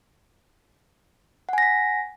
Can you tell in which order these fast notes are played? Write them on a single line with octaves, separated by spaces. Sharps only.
F#5 G#5 A#6 B6